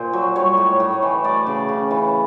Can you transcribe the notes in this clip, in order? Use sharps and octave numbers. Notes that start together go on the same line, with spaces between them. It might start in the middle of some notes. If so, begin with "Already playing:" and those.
Already playing: A#2 C5
F#3
G3 C#5
A2
A2
E3
A3 D5
C#3
C#3
E3